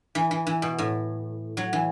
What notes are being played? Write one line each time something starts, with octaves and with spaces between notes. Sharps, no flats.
E3
E3
E3
B2
A2
F#3
E3